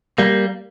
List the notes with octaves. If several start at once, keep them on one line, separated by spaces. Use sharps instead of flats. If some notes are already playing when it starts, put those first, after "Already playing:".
G3 A#3